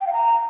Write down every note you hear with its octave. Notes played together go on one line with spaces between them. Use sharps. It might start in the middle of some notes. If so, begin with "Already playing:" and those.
G5
F5
A#5